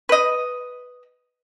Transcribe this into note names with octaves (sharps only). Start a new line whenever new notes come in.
B4 D#5